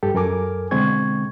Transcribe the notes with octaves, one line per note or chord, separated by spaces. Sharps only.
G2 G4 A4
F#2 A4 A#4 G#5 D6
B2 D3 G#3 C4 C#6 G#6